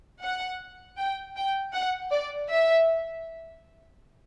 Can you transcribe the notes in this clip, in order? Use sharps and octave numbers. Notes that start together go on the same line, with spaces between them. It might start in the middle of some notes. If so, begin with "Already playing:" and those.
F#5
G5
G5
F#5
D5
E5